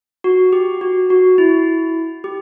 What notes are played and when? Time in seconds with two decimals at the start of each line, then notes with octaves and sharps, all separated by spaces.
0.24 F#4
0.53 G4
0.81 F#4
1.10 F#4
1.38 E4
2.24 G4